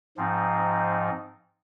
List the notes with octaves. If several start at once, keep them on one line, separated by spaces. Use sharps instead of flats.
G#2 F3 C4 D#4